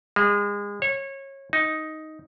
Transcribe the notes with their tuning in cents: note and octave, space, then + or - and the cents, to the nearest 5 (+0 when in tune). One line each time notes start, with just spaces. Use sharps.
G#3 -30
C#5 -25
D#4 +5